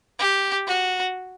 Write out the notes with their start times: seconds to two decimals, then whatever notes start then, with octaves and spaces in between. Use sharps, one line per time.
0.20 G4
0.68 F#4